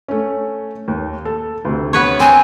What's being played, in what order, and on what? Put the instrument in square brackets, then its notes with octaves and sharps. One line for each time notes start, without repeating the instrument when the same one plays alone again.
[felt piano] A3 C#4
D#2
A4
D2 C3
[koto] B3 B4 C#5
[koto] C4 [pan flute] G#5